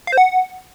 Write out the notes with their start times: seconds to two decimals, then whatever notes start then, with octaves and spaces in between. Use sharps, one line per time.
0.07 F5
0.12 C5
0.18 F#5